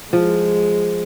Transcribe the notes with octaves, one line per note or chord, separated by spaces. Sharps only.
F3 G#3